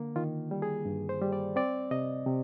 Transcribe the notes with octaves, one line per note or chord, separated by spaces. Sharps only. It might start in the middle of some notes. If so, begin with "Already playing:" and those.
Already playing: D3 A#3
D#3 F4
G3
G#4
G2
C5
G3
D5
C4 D5
C3 D#5
C3